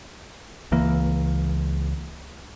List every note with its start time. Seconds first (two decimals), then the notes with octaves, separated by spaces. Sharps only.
0.72 C#2 E3 A#3